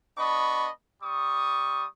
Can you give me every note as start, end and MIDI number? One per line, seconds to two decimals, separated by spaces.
0.18 0.69 59
0.18 0.69 62
0.18 0.69 75
0.18 0.69 83
0.18 0.69 85
1.02 1.86 55
1.02 1.86 85
1.02 1.86 87